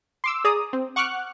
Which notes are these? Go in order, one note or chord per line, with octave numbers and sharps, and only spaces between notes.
C6 D6 E6
G#4 D5 A#5 D#6
C4
F#5 C#6 D6 F6 F#6